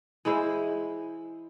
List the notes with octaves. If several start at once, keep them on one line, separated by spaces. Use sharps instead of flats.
E3 G#3 E4 C5